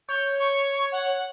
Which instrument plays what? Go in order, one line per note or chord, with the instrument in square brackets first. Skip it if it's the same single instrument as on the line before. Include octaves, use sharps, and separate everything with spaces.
[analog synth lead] C#5 [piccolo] G6
[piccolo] C#6
F#5